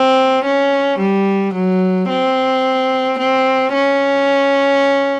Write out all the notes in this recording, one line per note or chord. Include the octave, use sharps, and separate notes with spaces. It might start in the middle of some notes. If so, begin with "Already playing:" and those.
Already playing: C4
C#4
G3
F#3
C4
C4
C#4